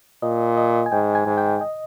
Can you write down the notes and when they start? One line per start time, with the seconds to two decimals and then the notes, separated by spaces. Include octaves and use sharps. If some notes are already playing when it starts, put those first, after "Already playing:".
0.22 A#2 D#5
0.57 D#5
0.86 G#5
0.92 G#2 G5
1.15 G#5
1.26 G#2
1.38 G5
1.61 D#5